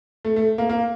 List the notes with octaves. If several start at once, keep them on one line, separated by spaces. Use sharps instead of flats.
A3
A3
A#3
A#3